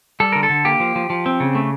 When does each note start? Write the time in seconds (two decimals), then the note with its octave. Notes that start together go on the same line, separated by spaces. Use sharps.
0.20 G3 A4
0.32 D3 A#4
0.43 A4
0.49 D3
0.65 A#3 G4
0.80 F3
0.96 F3
1.10 F3
1.26 C4
1.40 C#3
1.55 A3